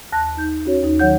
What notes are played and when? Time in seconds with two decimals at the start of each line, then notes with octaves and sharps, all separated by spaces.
0.12 D#2 A5 F#6 A#6
0.37 D#4 G6
0.66 C#4 F#4 C#5
0.83 D#2 D#4
0.99 D#3 F#3 C#5 F#5 G6